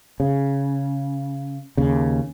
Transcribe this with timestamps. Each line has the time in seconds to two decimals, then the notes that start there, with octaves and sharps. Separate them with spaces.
0.20 C#3
1.77 D#2 C#3